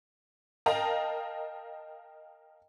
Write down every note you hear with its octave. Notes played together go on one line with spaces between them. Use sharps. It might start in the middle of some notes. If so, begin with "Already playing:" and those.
A#4 D#5 F5 G5 A5 A#5